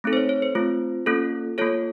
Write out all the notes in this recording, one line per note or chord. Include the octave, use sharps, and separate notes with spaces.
A3 C4 D#4 A4
C5
C#5
C#5
C5
A3 C4 F4
A#3 C#4 F4 A4
A#3 F4 A4 C#5